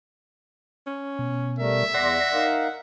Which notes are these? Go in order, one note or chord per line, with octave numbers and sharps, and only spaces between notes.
C#4
B2
G3 A3 A#4 E5
E2 D5 F#5 C6 A#6
D#4 A#4 F5